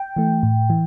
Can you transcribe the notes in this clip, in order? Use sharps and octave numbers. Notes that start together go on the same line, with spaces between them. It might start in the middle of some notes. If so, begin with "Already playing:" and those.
Already playing: G5
E3 A3
A2
E3